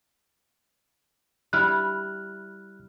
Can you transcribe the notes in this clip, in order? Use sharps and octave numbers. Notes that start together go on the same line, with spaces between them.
G3 E4 F6 F#6